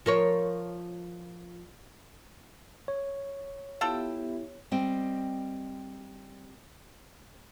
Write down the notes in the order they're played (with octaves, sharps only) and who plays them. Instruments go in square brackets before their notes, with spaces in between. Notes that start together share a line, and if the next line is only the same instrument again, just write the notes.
[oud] F3 A#4 C#5
[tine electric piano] C#5
[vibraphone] B3 G4 E5 [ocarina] E4 [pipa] F4 A4 G5
[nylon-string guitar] G3 C4 D#5 G5